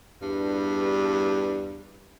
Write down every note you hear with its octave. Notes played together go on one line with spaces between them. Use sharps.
E2 G2